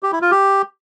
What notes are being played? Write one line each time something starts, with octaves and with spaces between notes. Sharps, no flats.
G4
E4
F4
G4